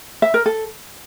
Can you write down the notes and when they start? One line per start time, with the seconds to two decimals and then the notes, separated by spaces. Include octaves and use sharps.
0.22 E5
0.34 A#4
0.46 A4